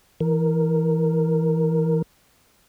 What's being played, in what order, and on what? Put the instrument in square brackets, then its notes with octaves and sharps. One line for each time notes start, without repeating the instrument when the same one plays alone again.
[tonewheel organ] E3 A#4